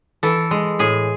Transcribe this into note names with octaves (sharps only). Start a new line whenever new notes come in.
E3 A4
G#3
A2 G#4